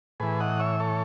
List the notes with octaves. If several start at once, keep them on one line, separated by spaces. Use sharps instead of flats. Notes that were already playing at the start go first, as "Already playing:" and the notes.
A2 E3 G#4 B4
D#5 F#5
C#5 E5
A4 C#5